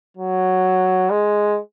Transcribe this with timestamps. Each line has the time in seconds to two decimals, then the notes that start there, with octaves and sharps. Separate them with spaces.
0.17 F#3
1.10 G#3